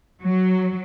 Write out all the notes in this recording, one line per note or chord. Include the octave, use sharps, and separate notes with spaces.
F#3